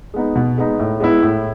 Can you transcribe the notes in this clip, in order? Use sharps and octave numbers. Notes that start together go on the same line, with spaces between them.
G#3 B3 D#4
B2
G#3 B3 D#4
A2
G#3 B3 E4
A2